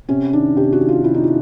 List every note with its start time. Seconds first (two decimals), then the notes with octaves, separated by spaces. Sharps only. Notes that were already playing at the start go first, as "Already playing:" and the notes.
0.09 C3 C#4
0.33 D#3 D4
0.56 C3 G4
0.72 F#4
0.81 D#3
0.89 F4
1.04 C3 E4
1.14 D#4
1.24 E4